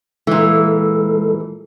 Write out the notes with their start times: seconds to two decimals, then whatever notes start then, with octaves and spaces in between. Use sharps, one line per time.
0.27 A#2 E3 G#3 A4